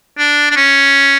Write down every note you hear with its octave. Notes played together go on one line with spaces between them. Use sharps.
D4
D4
C#4